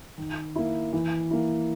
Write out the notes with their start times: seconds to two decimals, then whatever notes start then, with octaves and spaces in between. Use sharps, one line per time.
0.18 D#3
0.56 A#3 E4
0.93 E3
1.31 A#3 E4